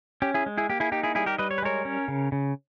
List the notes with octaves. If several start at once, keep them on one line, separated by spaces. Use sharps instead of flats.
C#4 G4
E4 G#4
G#3
E4 G#4
A#3 G4
E4 G#4
D#4 G4
E4 G#4
G3 E4 G#4
G4 A#4
G3 B4 D#5
C#5
B4
G#3 A#4 C#5
C#4
C#3
C#3